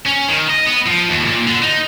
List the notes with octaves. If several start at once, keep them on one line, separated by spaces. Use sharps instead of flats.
C#4
D#3
D#5
B3
F3
D#2
A#2
D3
D#4